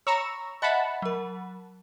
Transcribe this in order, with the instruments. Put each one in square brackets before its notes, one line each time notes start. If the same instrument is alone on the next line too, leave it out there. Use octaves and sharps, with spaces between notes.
[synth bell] C#5 B5 [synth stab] A#5 C#6 E6
[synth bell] D#5 E5 [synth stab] F#5 A5 B5
[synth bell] F#3 A#4